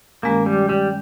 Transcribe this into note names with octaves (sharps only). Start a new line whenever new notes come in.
G2 D#3 G#3 A#3 C#4
G3
G3